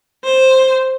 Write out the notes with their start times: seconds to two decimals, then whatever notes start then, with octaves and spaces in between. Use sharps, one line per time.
0.25 C5